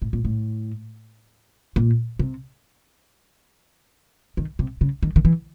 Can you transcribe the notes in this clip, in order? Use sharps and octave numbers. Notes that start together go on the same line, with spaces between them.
A2
A#2
A2
A#2
C3
D#3
C3
C#3
D#3
D#3
E3